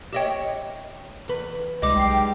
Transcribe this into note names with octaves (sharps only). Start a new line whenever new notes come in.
G4 C#5 D#5 E5 G5
E2 B4
C#2 G3 G#3 D#4 D#5 D6
B1 G5 D6 C7